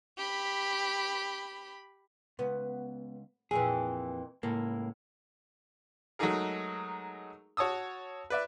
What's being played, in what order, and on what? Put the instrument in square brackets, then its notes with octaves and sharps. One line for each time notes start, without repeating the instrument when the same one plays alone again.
[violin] G4 B5
[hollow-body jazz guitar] C#2 [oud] B3
[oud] F2 A#2 E3 [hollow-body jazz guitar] G#4
[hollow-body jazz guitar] C#2 A#3 [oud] A2
[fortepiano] F#3 G#3 A3 D#4 G#4 A#4
F#4 C#5 A5 D#6 E6
B4 D5 E5